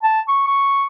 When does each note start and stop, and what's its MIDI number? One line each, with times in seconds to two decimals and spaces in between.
0.03 0.21 81
0.28 0.45 85
0.47 0.86 85